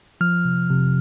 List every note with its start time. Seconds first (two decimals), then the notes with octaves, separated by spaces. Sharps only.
0.21 F3 F6
0.45 C3
0.70 C3